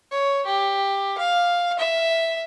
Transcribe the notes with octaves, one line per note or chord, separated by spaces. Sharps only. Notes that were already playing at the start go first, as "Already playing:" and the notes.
C#5
G4
F5
E5